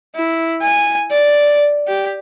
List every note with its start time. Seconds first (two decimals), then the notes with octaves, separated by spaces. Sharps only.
0.16 E4
0.62 G#5
1.11 D5
1.88 G4